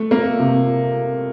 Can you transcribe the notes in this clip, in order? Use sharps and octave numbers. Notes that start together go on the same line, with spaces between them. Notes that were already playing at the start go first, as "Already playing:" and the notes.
Already playing: A3
A#3
C3